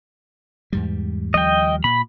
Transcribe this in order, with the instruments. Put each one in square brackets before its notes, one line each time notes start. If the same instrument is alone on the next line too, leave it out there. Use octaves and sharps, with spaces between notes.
[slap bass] E2 G#2 G3
[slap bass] D#2 F3 G3 [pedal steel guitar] D#5 G5
[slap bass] A#2 [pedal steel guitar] B5